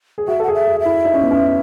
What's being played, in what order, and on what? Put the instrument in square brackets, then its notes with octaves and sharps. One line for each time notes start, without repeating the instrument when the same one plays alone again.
[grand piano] G#4
[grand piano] F#4 [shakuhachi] E5
[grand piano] A4
[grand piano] G#4 [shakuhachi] F#5
[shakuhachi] E5
[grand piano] G#4
[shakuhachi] E5
[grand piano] E4
D#4
C#4
B3
C#4